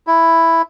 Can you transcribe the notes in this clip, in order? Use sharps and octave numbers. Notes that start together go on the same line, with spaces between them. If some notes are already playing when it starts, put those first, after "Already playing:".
E4